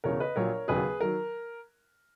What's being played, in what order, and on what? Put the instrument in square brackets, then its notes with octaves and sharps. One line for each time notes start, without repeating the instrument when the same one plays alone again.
[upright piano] E1 E2 C#3 A#4 C#5
B4 D#5
A#1 A#2 F#3 A#4 C#5
E1 D#2 C#3 F#3 G#4 B4
D#3 F#3 A#4